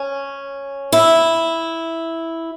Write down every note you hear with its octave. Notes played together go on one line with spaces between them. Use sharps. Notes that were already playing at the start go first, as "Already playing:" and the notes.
Already playing: C#4
E4